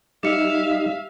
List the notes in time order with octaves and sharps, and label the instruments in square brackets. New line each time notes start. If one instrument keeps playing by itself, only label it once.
[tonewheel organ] G3 D#4 [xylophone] G4 C#7 [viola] E5 F5